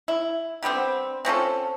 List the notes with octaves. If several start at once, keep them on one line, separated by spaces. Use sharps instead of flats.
E4
D3 G3 B3 C4
C4 C#4 F4 A4